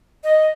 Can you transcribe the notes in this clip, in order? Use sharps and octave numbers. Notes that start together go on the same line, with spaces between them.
D#5